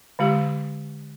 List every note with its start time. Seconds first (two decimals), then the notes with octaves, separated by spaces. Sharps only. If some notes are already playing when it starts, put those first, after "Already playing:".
0.19 D3 G#3 G4